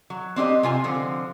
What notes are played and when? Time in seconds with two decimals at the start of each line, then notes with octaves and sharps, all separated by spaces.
0.10 F#3
0.36 C4 D4 G4 D#5
0.63 C3 F4 G#5
0.84 D3 F3 C4